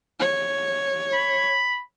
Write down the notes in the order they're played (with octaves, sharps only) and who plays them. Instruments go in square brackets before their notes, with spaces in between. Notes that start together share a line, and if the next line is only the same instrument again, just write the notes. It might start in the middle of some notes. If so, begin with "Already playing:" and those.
[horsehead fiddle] C#5
[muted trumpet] B5